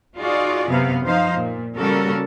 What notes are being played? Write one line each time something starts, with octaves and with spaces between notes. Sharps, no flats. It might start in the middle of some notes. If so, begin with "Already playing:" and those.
D#4 F4 F#4 G#4 D5
F#2 C3 B3 F5
F3 D#4 C5 F5
A#2
C#3 G3 A#3 F#4 A4 A#4